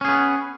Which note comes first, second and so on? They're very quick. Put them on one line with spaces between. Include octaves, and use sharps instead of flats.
C#4 G#4 B3